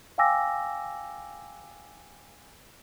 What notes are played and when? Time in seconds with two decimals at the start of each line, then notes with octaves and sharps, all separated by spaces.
0.18 F5 G5 G#5 D6 E6 A#6